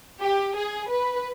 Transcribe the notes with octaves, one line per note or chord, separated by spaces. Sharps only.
G4
G#4
B4